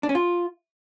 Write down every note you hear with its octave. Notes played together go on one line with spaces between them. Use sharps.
D4
C#4
F4